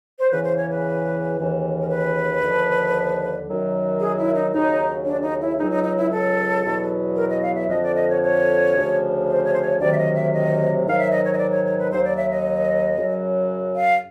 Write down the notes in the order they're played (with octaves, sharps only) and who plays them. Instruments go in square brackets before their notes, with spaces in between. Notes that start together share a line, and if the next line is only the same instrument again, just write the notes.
[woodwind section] C5
E2 C#3 E3 B4
C5
C#5
B4
D#2 C#3 E3
A#4
B4
D#2 D3 F3
F#2 D#3 F#3
G#4
E4
D#4
D#2 C#3 F#3 D#4
D4
D#4
E4
C#2 C#3 F#3 D#4
D#4
D#4
E4
A4
E2 B2 F#3
A#4
D#5
F5
E5
F2 D3 F3 D#5
D5
D#5
C#5
C#5
D2 C#3 F3
C5
C#5
C5
C#5
D2 C3 D#3 F#3 D5
E5
D#5
E5
D#5
G#2 D#3 F#3 F5
E5
D#5
C#5
D#5
D5
C#5
C#5
B4
D#2 D#3 F#3 C5
D5
E5
D#5
F#2 C#3 F#3
F5